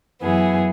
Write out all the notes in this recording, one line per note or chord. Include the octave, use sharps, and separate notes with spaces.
F#2 E3 B3 G#4